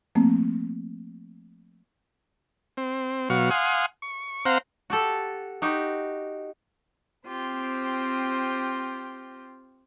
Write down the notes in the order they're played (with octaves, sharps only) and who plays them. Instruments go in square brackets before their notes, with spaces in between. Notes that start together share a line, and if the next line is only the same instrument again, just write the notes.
[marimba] F3 A3 A#3 C4
[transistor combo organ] C4
B2 F#3 F5 C#6
F5 F#5 G#5 C6 D#6
C#6
C4 C5 F5 F#5 A#5
[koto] F#4 G4 A4
D#4 F#4 G4
[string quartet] C4 F4 G4 C5